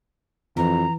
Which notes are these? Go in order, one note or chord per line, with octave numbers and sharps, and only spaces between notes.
F2 E3 A#5